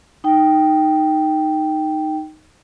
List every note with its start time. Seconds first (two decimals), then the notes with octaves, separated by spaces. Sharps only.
0.24 D#4 G5